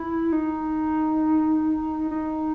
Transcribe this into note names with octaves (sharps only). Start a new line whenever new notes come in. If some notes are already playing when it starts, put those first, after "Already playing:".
Already playing: E4
D#4
D#4